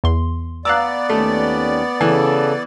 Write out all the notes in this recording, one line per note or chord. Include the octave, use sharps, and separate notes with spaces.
E2 C6
B3 D5 F5 A#5 D6 E6 F#6
D#2 D#3 A3 C#4
C#3 E3 A4